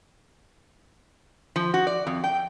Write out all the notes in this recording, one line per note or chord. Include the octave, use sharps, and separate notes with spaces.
F3
F#4
D5
F2
G5